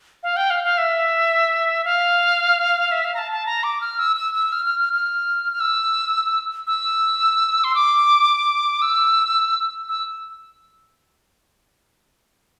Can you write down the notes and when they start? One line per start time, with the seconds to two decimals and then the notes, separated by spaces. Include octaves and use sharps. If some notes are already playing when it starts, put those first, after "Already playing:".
0.23 F5
0.37 G5
0.50 F5
0.64 F5
0.78 E5
1.85 F5
2.91 E5
3.05 F5
3.14 A#5
3.18 A5
3.32 A5
3.46 A#5
3.63 D6
3.81 F6
3.99 E6
4.16 E6
4.34 E6
4.52 F6
4.65 F6
4.80 F6
4.93 F6
5.53 F6
5.60 E6
6.67 E6
7.64 C6
7.75 D6
8.82 E6
9.89 E6